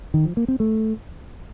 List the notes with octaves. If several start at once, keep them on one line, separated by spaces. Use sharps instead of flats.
D#3
F3
A#3
C4
A3